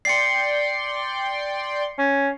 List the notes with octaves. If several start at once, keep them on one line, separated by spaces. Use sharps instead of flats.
D5 G5 C6 C7 C#7
C#4